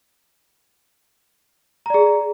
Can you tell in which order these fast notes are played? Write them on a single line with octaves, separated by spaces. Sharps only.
A#5 D5 G#4